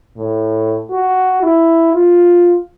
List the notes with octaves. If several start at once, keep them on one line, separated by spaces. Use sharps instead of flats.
A2
F#4
E4
F4